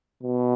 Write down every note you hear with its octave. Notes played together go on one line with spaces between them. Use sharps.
B2